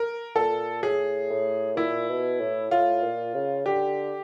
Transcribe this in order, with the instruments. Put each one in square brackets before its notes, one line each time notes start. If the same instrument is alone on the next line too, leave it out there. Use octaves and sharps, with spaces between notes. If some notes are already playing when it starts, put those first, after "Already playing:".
Already playing: [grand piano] A#4
[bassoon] A#2 [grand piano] A4
[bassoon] A2 [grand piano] G#4
[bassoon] A2
[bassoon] A#2 [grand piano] E4
[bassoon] B2
A2
[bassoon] A2 [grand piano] F4
[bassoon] A#2
C#3
[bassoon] D3 [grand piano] G4